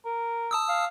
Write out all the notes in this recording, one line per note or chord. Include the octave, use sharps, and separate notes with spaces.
A#4
A5 D#6 E6
F5